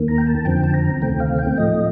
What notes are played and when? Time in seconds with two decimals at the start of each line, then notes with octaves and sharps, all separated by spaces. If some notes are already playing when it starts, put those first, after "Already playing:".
Already playing: D#2 D#3 A#3
0.08 A#5
0.18 G5
0.27 A5
0.45 F2 D3 F3 C4 G5
0.63 A5
0.74 A#5
1.01 D2 C3 D#3 A3 C4 G5
1.20 F5
1.38 G5
1.57 A2 F3 A3 D#5